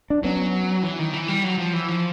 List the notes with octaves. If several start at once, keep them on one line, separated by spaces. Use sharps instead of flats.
D4
F#3 B3 C#4
E3
D#3
E3
G3
F#3
F3
E3
F3